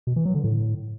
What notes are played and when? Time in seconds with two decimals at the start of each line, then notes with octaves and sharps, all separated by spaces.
0.07 B2
0.16 E3
0.25 F#3
0.35 D3
0.44 A2